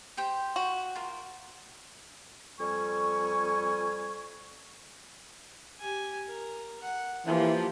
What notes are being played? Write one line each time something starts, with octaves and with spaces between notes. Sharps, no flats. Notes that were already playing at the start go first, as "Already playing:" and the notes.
G4 C5 G5
F#4
F4 A#4
F2 G3 G#5 C#6
G4 G#5
A#4
F#5
E3 F3 A#3 G4